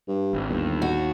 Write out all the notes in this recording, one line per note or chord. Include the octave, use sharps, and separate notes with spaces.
G2
G#1
G1 D#2
F#4